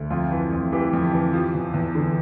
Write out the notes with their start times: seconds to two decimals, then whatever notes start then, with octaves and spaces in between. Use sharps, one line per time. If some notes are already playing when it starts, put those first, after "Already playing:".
Already playing: D2
0.10 F2 F4
0.31 E3
0.52 F2
0.72 E3 G4
0.93 F2
1.13 E3
1.33 F3
1.54 E2
1.74 E2
1.95 D3